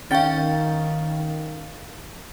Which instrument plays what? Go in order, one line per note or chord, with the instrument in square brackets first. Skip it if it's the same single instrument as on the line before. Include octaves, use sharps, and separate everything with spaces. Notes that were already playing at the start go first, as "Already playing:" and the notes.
[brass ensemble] D#3 [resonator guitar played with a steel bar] C#4 G5 [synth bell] F5 A6